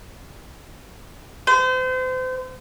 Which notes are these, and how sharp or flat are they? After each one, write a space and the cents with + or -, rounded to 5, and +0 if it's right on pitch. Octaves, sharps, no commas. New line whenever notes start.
C5 -35